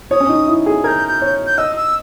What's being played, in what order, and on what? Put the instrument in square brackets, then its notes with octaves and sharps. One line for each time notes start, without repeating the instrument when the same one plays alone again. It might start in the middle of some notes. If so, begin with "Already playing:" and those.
[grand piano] C#5 [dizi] D#6
[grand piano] C#4
D#4
E4
G#4
[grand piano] A#4 [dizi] G6 G#6
[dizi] G6
[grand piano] C#5
[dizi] G6
[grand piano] D#5 [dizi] E6
[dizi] E6